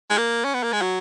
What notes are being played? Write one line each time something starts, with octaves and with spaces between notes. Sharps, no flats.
G#3
A#3
C#4
B3
A#3
G#3
F#3